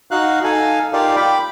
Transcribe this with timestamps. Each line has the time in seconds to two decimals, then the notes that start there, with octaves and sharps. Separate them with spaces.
0.11 D#4 F#4 F5 F#6
0.44 D#4 A4 F5 G#5
0.93 D#4 F4 G4 A#4 D5 F5
1.16 G5 B5 D6